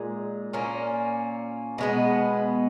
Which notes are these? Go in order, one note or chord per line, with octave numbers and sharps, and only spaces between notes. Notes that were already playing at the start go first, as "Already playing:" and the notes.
Already playing: A#2 G#3 D#4
A#2 A#3 C#4
B2 G#3 B3